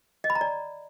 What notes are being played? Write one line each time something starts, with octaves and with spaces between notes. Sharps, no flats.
D#5
B5
A#5
D5